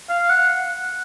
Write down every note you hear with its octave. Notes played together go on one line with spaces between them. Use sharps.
F5
F#5